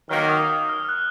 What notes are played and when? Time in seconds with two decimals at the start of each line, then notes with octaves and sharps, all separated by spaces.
0.09 D#3 F#3 A#3 F6
0.29 D#6
0.50 D#6
0.69 F6
0.80 F6
0.89 F#6